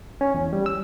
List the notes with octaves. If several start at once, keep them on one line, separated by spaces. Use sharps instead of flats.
C#4
E2
G3
E6